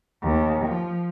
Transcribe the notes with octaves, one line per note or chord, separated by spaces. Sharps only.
D#2
F3